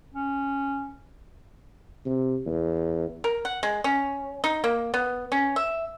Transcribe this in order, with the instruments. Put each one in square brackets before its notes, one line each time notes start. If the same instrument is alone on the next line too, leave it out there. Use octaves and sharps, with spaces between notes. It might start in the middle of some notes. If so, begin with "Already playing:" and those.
[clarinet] C#4
[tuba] C3
E2
[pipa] A#4
F#5
G#3
C#4
D#4
A#3
B3
C#4
E5